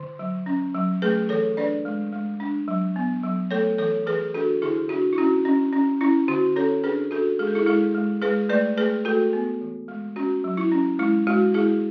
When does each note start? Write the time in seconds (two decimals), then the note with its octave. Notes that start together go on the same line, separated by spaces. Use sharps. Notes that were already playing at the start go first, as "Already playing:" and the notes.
Already playing: D3
0.19 F#3
0.46 C#4
0.74 F#3
1.02 A3 G#4 B4
1.29 E3 A4 C#5
1.57 D4 B4 D5
1.85 G#3
2.13 G#3
2.40 D4
2.68 F#3
2.96 B3
3.23 F#3
3.51 A3 A4 C#5
3.78 E3 A4 C#5
4.06 E3 G#4 B4
4.34 D4 F#4 A4
4.62 D3 E4 G#4
4.89 D4 F#4
5.13 E4
5.18 C#4 F#4
5.45 C#4
5.73 C#4
6.01 C#4 E4
6.28 D3 F#4
6.56 C#4 A4 C#5
6.84 D4 G#4 B4
7.11 D4 F#4 A4
7.39 G#3 G#4
7.47 A4
7.55 E4 G#4
7.66 G#3 E4 G#4
7.95 G#3
8.22 G#3 G#4 B4
8.49 A3 B4 D5
8.77 A3 G#4 B4
9.05 A3 F#4 A4
9.33 B3
9.61 E3
9.88 G#3
10.16 C#4 F#4
10.44 F#3
10.57 E4
10.72 C#4
10.99 G#3 E4
11.27 G#3 F#4
11.54 G#3 E4 G#4